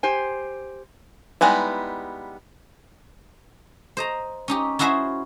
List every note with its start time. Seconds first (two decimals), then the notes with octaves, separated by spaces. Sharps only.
0.03 G4 C5 G#5
1.41 G3 G#3 B3 D#4 E4
3.97 C5 D#5 A#5
4.48 C#4 D#4 G4
4.79 C#4 E4 F#4 G#4 C5 E5